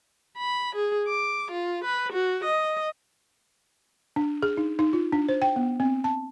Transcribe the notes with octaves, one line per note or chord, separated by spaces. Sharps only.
B5
G#4
D6
F4
B4
F#4
D#5
D4
G#4
D#4
D#4
F4
D4
C5
G5
B3
C4
A5